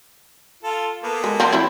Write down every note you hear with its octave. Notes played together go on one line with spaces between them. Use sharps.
F4 A4
A#3 B3 A4
G#3
F3 C4
E3 C4 E4